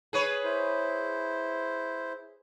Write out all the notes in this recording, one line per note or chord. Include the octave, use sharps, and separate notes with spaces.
G#4 B4 C#5
E4 C5